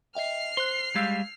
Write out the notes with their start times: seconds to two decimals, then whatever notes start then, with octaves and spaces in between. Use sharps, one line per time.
0.15 D#5 E5 G5 F6 C7
0.57 C5 C6 F#6
0.95 G3 G#3 F5 E6 G6 G#6